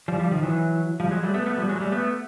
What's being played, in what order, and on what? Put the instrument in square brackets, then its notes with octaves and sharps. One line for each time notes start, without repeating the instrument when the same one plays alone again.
[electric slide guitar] F3 G3
F3 G3
D#3 F3
E3 F#3
F3 G3
F#3 G#3
G3 A3
A3 B3
A3 B3
F3 G3
F#3 G#3
G3 A3
A3 B3